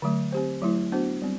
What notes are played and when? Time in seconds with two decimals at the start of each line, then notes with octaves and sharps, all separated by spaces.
0.02 D3 F#3 A3
0.32 C4 G4 C5
0.62 F#3 A3 E4
0.92 B3 D4 F#4 C5
1.22 G3 C4